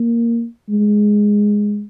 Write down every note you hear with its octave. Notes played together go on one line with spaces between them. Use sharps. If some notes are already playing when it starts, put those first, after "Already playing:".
Already playing: A#3
G#3